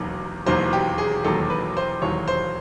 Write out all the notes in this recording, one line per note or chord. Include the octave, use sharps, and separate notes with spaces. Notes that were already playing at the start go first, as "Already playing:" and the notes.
Already playing: E1 D#2 D#3 F#3
E1 D#2 D#3 F#3 C5
G4
G#4
E1 D#2 D#3 F#3 A4
B4
C5
E1 D#2 D#3 F#3 C#5
C5